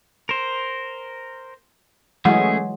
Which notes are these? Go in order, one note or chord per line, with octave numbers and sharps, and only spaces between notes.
A#4 C5
E3 F#3 G#3 A3 C#4 G#4 F#5